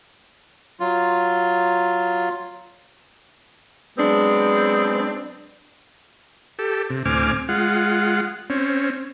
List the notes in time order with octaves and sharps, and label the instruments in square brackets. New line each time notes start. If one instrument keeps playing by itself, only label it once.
[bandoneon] F#3 F4
[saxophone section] F#3 G#3 B3 C4 D4
[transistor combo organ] G4 A4
C3
D2 A2 C4 G#5 D6 F6
G#3 F4 F#5
C4 C#4